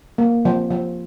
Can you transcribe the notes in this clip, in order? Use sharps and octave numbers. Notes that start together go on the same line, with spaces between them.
A#3
F3
F3